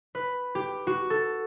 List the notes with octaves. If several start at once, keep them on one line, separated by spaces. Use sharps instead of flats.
B4
G4
F#4
A4